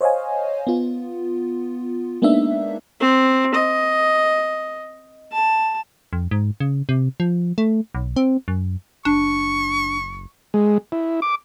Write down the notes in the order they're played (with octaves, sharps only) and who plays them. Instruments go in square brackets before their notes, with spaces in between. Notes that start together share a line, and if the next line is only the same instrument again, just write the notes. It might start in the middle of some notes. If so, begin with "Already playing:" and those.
[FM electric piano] C5 C#5 D#5 F5 G#5
B3 F4
G#3 A#3 B3 D4 D#4 E5
[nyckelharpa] C4
D#5
A5
[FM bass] F2
G#2
C#3
C3
F3
A3
B1
C4
F#2
[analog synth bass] F#1 [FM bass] D4 [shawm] C#6
[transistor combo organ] G#3
E4
D6